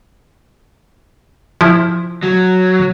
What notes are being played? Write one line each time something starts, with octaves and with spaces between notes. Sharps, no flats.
F3 E4
F#3